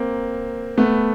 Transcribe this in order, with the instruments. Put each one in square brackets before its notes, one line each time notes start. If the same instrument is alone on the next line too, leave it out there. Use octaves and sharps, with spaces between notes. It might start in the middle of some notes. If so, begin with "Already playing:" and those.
Already playing: [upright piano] A#3 C4
A3 B3